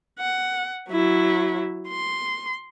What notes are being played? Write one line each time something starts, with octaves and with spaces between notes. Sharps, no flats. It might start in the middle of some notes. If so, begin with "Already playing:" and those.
F#5
F#3 E4
C6